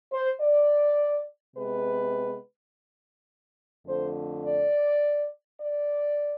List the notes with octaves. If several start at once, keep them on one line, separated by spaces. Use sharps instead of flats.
C5
D5
C3 G#3 B3 B4
F2 D3 A3 C5
D5
D5